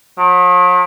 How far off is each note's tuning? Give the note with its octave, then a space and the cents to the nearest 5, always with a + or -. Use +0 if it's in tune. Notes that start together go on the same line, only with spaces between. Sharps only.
F#3 -45